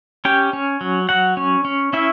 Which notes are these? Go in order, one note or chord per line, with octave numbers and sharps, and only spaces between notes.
C#4 G4 G5
C#4
F#3
F#3 F#4 F#5
C#4
C#4
C#4 E4 E5